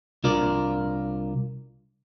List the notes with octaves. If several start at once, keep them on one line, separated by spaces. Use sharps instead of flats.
C2 D4 F4 A#4 D5